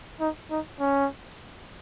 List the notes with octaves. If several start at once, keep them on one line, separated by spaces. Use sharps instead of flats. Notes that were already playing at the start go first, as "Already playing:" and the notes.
D#4
D#4
C#4